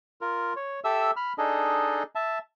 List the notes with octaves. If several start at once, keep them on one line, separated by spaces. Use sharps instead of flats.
F4 A#4
C#5
G4 A4 E5 E6
B5 F6
D4 D#4 G#4 A4 D#5
E5 A5